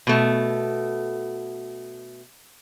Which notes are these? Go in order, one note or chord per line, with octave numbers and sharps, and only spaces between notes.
B2 A3